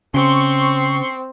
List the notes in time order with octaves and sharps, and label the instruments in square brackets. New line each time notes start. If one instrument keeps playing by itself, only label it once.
[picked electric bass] C#3 [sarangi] C4 [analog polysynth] C6 C#6